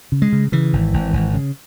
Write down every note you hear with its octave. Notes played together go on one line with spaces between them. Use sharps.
C#3
G#3
C#3
C#3 E3
G#1
G#1
G#1
C#3